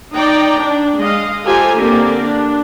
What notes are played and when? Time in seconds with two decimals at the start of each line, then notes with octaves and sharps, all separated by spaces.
0.14 D#4 D5 G5 A#5
0.57 D4 D5
0.99 G#3 D#5 F5
1.44 F4 G4 A4 C5 G#5 A#5
1.77 D3 A#3 C4 G4 A#4 D5
2.25 D4